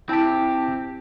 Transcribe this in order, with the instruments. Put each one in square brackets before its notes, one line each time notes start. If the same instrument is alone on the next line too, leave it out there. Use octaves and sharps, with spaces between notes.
[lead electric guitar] C4 G4 [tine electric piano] E4 G5 A5